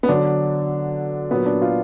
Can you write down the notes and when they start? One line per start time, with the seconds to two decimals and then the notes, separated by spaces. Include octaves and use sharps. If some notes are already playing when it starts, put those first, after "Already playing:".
0.03 B3
0.09 D3 F#3 D4
1.31 A#2 F#3 B3
1.46 D4
1.62 F4